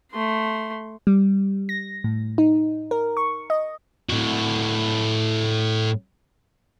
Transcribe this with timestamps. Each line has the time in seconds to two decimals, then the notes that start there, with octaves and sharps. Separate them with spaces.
0.12 A3 C6
1.07 G3
1.69 A#6
2.04 A2
2.38 D#4
2.91 A#4
3.17 C#6
3.50 D#5
4.10 A2 F#4